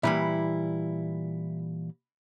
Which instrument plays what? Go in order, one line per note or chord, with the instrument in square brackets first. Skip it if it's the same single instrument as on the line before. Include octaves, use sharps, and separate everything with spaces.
[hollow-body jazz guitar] A#2 E3 G3 [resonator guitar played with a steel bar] E4